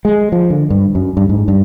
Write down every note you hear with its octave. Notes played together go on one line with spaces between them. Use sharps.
G#3
F3
D3
G2
F#2
G2
G#2
G2